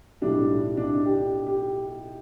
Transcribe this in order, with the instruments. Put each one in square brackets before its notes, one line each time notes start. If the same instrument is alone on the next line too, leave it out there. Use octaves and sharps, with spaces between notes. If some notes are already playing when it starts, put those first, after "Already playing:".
[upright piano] B1 A2 G3 D4
D4
G4
G4